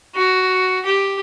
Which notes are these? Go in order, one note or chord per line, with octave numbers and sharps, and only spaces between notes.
F#4
G4